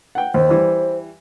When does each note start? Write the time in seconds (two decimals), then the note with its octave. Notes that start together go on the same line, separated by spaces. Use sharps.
0.15 F#5 G5
0.34 D#2 C5
0.49 E3 G3